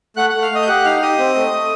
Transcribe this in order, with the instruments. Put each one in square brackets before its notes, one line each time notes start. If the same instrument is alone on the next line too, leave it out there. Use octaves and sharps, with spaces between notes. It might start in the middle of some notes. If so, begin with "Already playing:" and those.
[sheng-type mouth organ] A3 F#5 F#6
A3 F#5 F#6
F5 F6
A3 D#5 D#6
G6
G4 F#5 F#6
D#4 F5 F6
G4 D#5 D#6
C4
A3
A3